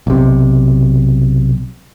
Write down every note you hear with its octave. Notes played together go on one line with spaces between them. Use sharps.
B1 C3